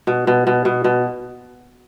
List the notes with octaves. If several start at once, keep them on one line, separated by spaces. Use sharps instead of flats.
B2
B2
B2
B2
B2